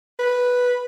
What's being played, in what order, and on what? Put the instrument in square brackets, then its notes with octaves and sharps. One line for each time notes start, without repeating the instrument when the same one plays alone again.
[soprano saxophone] B4